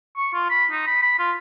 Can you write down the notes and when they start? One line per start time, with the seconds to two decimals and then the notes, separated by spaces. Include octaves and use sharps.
0.17 C#6
0.34 F4
0.50 B5
0.71 D#4
0.87 B5
1.02 B5
1.19 F4